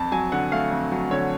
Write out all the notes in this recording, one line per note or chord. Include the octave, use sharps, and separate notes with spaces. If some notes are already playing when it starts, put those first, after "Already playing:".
Already playing: F2 A5
F#3 G#5
D3 F#5
A3 F5
F2
F#3
D3 C#5